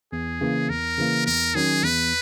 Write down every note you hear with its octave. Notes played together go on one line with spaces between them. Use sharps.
E2 G#4
C#3 E3 A#3
E2 A#4
C#3 E3 A#3
E2 A#4
D#3 F#3 C#4 G#4
E2 B4